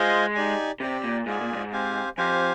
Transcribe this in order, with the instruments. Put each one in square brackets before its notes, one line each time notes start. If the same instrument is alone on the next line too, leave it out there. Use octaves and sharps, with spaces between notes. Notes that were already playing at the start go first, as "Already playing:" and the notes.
Already playing: [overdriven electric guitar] G#3 [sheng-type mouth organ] F4 C5 D#5 G#5
[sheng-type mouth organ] D#4 G4 D5 G#5
[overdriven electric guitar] C3 [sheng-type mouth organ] G4 D5 G5
[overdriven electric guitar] A#2
[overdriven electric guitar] G#2 [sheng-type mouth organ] F4 G#4 D5 G#5
[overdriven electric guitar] A#2
G2
G#2
[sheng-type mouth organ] C4 G4 C5 F5 G#5
[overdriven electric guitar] F2 [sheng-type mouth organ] G4 C5 F5 G#5